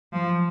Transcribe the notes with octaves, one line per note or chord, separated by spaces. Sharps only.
F3